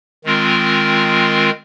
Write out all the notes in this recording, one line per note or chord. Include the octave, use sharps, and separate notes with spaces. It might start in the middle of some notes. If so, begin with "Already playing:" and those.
D#3 G#3 C4 F4 A#4